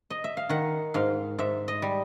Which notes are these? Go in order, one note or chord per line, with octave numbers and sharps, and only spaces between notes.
D#5
E5
F5
D#3 F#5
G#2 F5
G#2 E5
D#5
G3